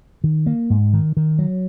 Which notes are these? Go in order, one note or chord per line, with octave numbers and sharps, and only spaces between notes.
D#3
A#3
G#2
D#3
D#3
F#3